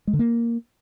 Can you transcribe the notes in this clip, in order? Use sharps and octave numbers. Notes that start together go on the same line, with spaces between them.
G#3
D3
A#3